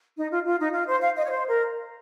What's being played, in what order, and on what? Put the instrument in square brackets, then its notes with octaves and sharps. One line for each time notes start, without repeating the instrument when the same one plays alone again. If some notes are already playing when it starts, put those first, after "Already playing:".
[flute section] D#4
F4
F4
D#4
F4
C5
F5
D#5
C#5
C5
A#4